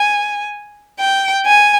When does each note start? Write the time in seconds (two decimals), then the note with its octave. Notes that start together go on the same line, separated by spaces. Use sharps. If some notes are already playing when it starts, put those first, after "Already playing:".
Already playing: G#5
0.99 G5
1.46 G#5